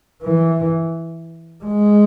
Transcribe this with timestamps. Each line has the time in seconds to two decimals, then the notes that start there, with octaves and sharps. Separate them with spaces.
0.23 E3
1.64 G#3